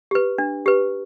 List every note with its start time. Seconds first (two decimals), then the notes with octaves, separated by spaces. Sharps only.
0.11 G4 B4
0.38 D4
0.66 G4 B4